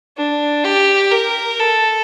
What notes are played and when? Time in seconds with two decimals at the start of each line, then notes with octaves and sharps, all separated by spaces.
0.17 D4
0.64 G4
1.11 A#4
1.58 A4